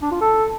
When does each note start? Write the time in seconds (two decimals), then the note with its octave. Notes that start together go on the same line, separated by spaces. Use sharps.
0.02 D4
0.11 F4
0.21 A4